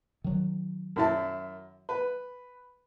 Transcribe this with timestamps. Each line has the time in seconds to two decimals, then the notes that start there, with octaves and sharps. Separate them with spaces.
0.24 D#3 F#3
0.96 F#2 E4 A5
1.89 B4